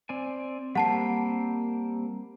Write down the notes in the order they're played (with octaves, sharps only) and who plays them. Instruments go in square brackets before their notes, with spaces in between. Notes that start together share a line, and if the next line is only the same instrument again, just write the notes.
[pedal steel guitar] C4 D5 G#5
[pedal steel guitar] G3 A#3 C4 [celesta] F#5 A5 C7